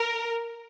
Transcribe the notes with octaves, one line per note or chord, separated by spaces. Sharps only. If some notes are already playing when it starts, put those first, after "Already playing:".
Already playing: A#4